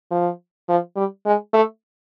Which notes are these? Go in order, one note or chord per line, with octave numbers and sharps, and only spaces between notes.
F3
F3
G3
G#3
A3